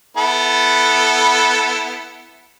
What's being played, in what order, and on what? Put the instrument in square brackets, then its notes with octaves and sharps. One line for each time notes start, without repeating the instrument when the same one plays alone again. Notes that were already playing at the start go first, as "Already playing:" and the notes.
[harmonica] B3 E4 A4